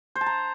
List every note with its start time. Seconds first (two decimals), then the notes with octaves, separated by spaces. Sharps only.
0.16 C5
0.21 A5
0.26 A#5